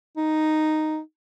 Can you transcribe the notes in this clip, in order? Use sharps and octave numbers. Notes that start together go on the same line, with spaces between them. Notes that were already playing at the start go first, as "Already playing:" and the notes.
D#4